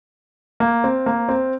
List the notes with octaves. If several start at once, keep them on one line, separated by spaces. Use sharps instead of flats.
A#3
C4
A#3
C4